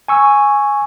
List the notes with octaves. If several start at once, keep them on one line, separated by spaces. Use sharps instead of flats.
G#5 C#6 E6